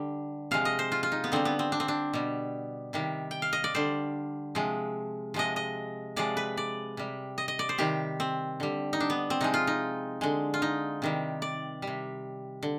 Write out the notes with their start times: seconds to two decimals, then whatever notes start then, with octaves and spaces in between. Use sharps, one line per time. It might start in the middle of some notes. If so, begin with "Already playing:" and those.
Already playing: D3 G3
0.51 C3 F3 G#3 F5
0.65 D#5
0.79 C5
0.92 F4
1.03 F4
1.12 D#4
1.24 B3
1.32 D3 G3 C4
1.45 B3
1.59 C4
1.72 D4
1.80 C4
1.88 D4
2.13 B2 G3
2.93 C3 D#3 G3
3.31 G5
3.42 F5
3.53 D#5
3.64 D5
3.74 D3 G3 C5
4.55 C3 F3 G#3
5.34 C3 F3 G#3 D#5
5.56 D#5
6.16 C3 F3 G#3 D5
6.37 B4
6.57 D5
6.97 C3 G3
7.38 D#5
7.48 D#5
7.59 D5
7.69 C5
7.78 C3 D#3 G3 G4
8.20 C4
8.60 D3 G3
8.93 D#4
9.00 D4
9.10 B3
9.30 C4
9.41 C3 F3 G#3 D#4
9.54 F4
9.67 D#4
10.21 D3 G#3
10.54 F4
10.62 D#4
11.02 C3 D#3 G3
11.42 D5
11.82 G3
11.87 C3
12.63 D3